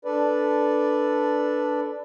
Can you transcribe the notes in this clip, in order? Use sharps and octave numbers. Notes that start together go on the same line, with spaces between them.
D4 A4 B4 D5